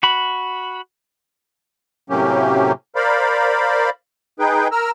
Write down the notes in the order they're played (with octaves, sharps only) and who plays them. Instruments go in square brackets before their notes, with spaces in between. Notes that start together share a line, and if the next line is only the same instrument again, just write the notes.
[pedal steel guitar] F#4 B5
[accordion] A2 C3 F#3 A#3 C#4 G4
A#4 C5 D5 F5 B5
D#4 G#4 B4 G5
A#4 A#5 E6 F6